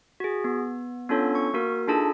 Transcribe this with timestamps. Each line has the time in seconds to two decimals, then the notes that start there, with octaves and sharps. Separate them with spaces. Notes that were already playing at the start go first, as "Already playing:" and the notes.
0.20 F#4 G#4
0.44 B3
1.09 B3 C#4 D4 F4 A4 C#5
1.35 C#6
1.54 A#3 F#4 A#4
1.88 D4 D#4 F4 G#4 A4 A5